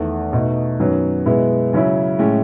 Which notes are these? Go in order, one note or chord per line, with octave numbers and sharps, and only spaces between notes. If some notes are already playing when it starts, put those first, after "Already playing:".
Already playing: E2 D#3 A3
B2 A3 D#4
F#2 D#3 F#3 B3
B2 G#3 B3 E4
C#3 F#3 C#4 E4
A2 G#3 C#4